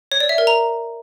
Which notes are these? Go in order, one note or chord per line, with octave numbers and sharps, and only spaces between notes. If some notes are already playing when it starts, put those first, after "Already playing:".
C#5
D5
E5
A#4
A#5